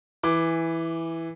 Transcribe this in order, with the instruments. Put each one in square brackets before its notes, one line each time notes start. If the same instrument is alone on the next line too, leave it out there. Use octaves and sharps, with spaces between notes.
[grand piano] E3 D6